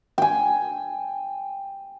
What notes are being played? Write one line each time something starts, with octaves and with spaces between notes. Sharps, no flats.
G5 G#5